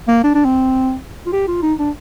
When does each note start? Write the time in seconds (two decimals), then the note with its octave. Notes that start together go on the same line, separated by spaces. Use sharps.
0.08 A#3
0.24 D4
0.35 D4
0.45 C4
1.26 F4
1.33 G4
1.48 F4
1.63 D#4
1.79 D4